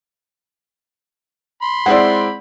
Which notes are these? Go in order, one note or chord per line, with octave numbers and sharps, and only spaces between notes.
B5 C6
G#3 C4 E4 D5 F#5